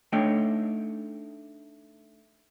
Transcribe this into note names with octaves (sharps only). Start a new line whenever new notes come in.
A3 D4 D#4 C#5 D#5 G5